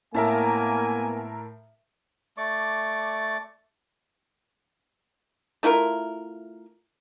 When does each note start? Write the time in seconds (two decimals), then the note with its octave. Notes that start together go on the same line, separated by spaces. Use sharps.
0.14 A2 A#3 B3 A#4 E5 G#5 A5
2.37 A3 D5 C#6 D6
5.63 A3 E4 F4 A#4